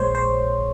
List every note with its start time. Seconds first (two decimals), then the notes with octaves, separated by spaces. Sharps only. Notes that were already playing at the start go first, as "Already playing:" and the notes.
Already playing: A#1 A#2 G#3 C5 C#5
0.15 C5